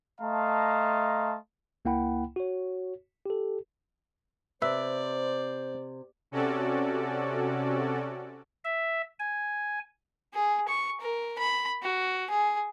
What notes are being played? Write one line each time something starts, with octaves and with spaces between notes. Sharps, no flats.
A3 D#5 F5 A5 A#5 C6
C#2 A#3 E4 F#5 G5 B5
F#4 C#5
G4 A4
C3 B4 C5 D5 E5
C3 C#4 F#4 A4 D5
E5
G#5
G#4
C#6
A#4
B5
F#4
G#4